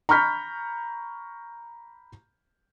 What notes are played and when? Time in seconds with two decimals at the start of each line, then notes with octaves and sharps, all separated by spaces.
0.09 A#5 B5 C#6 F6 G6 B6